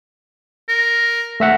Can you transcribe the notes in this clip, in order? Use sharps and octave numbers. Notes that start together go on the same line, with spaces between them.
A#4
A3 E5 F#5